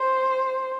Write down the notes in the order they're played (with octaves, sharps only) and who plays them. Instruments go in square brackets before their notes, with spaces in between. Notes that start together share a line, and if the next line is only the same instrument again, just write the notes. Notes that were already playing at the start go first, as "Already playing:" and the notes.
Already playing: [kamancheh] C5